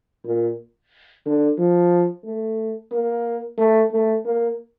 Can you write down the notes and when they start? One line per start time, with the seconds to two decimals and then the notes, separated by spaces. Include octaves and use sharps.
0.25 A#2
1.25 D3
1.58 F3
2.24 A3
2.92 A#3
3.58 A3
3.92 A3
4.24 A#3